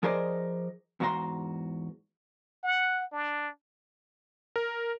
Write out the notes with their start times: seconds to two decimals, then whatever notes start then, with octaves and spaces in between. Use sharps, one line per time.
0.03 F3 G#4 A#4 C5 D5 D#5
1.00 E2 G#2 F#4 F5 A#5 C6
2.63 F#5
3.12 D4
4.56 A#4